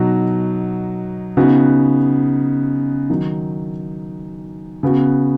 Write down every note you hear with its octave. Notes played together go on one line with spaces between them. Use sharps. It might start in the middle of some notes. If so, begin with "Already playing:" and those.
Already playing: B2 F#3 D#4 F#4
C#3 B3 D#4 F#4
D#3 F#3 D#4
C#3 B3 F#4